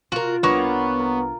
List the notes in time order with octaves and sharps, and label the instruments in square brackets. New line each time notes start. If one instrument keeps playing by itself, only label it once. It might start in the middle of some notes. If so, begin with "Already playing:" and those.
[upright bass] C3 [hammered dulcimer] F4 [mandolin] F#4 A#4
[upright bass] C2 D4 [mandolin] A#3 C#5 F#5 [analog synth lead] B3
[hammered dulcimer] A#4